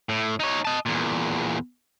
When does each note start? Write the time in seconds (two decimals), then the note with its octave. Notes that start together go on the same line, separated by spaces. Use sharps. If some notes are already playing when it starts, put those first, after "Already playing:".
0.09 A2
0.40 D#4 C#5
0.65 D#5 A5
0.86 E2 A#2